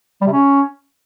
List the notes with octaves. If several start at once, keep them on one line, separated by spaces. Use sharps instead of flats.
G3
C3
C#4